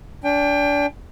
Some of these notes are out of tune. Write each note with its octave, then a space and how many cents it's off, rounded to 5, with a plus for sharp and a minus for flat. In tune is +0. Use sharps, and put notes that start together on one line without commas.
D4 -25 G5 +25